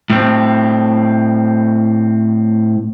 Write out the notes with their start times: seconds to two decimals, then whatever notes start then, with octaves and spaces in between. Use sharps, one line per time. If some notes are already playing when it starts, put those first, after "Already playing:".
0.10 A2 C4